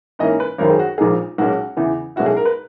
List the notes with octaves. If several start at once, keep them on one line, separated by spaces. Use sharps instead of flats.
G#2 E3 A#3 C#4 D#5
B4
G#1 F#2 D#3 A#4
G#4
F#4
A#1 A#2 G#3 D#4 G#4
B1 A#2 G#3 C#4 F#4
E2 C#3 E3 B3
B1 B2 G#3 C#4 E4 F#4
G#4
A#4
B4